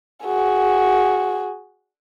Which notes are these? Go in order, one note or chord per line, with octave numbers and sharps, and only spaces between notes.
F#4 G#4